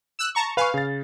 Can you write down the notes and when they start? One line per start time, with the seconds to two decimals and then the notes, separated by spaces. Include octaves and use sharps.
0.19 E6 F#6
0.35 A5 A#5 C#6
0.57 B4 F5 G#5 C#6
0.74 C#3 A6